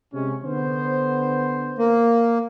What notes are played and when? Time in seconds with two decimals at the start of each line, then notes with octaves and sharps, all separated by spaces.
0.14 C3 G#3 C#4
0.45 D3 B3 C5
1.78 A#3